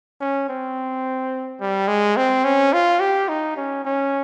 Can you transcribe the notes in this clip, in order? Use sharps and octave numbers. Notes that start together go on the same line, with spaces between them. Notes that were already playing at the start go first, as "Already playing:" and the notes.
C#4
C4
G3
G#3
C4
C#4
F4
G4
D#4
C#4
C#4